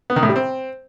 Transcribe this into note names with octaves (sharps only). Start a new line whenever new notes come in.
B3
D#3
A2
G3
C4